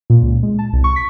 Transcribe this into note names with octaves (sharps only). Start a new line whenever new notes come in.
A#2
C#2
G#3
A5
C2
C#6
B6